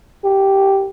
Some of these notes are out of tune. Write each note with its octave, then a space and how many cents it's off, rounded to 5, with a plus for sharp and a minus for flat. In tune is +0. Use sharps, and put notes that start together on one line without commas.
G4 -5